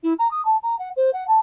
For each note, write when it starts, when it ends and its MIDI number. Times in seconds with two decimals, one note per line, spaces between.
0.03 0.13 64
0.19 0.30 82
0.31 0.44 87
0.45 0.56 81
0.63 0.78 82
0.78 0.89 78
0.96 1.10 72
1.13 1.26 78
1.27 1.39 81